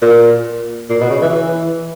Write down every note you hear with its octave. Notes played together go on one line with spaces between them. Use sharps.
A#2
A#2
B2
C#3
E3
E3